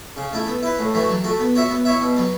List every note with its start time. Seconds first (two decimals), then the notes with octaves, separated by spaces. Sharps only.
0.17 C#3
0.33 A3 E4
0.47 B3
0.63 E4 B4
0.79 A2
0.94 E3 A3 F#4
1.09 F#3
1.24 A3 F#4
1.40 B3
1.55 F#4 C#5 E5
1.70 B3
1.85 E4 C#5 E5
2.01 B2
2.17 F#3 B3